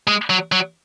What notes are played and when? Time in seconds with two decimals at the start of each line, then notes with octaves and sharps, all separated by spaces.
0.07 G#3
0.30 F#3
0.52 F#3